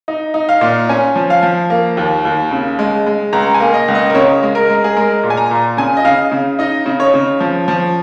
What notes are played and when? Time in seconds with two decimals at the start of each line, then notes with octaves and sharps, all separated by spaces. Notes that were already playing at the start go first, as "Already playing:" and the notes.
0.08 D#4
0.34 D#4
0.49 F5
0.61 A#2
0.89 C#4 G#5
1.16 F3
1.30 F5
1.43 F3
1.70 A#3
1.97 D#2
2.25 D#2
2.51 C#3
2.79 G#3
3.07 G#3
3.33 C#2 A#5
3.54 G#5
3.60 A#3
3.74 D#5
3.88 C#2
3.95 D#5
4.10 A#4
4.14 C#3 C#5
4.43 G#3
4.55 A#4
4.69 G#3
4.84 G#4
4.96 G#3 A#4
5.23 A#2
5.30 G#5
5.37 A#5
5.51 A#2
5.77 C#3 G#5
5.97 D#5
6.04 C#3 F5
6.32 C#3
6.59 D#4 D#5
6.86 C#3
7.00 C#5
7.14 C#3
7.40 F3
7.68 F3